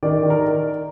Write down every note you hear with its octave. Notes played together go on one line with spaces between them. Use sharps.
D#3 D5
D#3
A#4